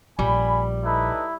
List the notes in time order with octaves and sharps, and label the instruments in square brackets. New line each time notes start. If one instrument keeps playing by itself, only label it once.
[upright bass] A#1 [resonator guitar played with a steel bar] G3 [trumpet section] G#5 B5
[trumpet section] D#4 A4 B4 [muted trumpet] E4